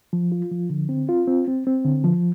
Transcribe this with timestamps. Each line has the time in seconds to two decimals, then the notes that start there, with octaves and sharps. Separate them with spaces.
0.13 F3
0.32 F4
0.51 F3
0.70 D3
0.89 C4
1.09 F4
1.28 C4
1.48 C4
1.67 C4
1.85 D3
2.04 F3